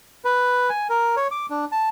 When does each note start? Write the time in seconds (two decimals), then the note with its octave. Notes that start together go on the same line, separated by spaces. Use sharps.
0.25 B4
0.70 G#5
0.90 A#4
1.16 C#5
1.31 D6
1.50 D4
1.72 A5